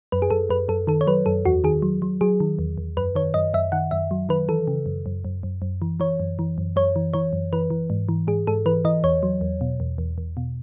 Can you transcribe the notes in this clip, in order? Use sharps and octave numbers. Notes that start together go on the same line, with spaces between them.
F#2 B4
G#4
F#2 A4
F#2 B4
F#2 A4
D#3 A4
C#5
F#3 B4
F#2 A4
E2 F#4
D#3 G#4
F#3
F#3
F#3 G#4
D#3
E2
E2
F#2 B4
D#3 C#5
F#2 D#5
F#2 E5
D#3 F#5
F#2 E5
F#3
D#3 B4
E3 A4
C#3
F#2
F#2
F#2
F#2
F#2
E3
E3 C#5
F#2
E3
F#2
F#2 C#5
E3
E3 C#5
F#2
E3 B4
E3
G#2
E3
G#2 G#4
G#2 A4
E3 B4
E3 D#5
E2 C#5
F#3
E2
B2
E2
E2
E2
B2